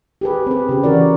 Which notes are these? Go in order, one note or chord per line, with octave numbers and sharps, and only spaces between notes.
G4 G#4 B4
C4 B4
C#3 G4
E3 F#4 A#4 D5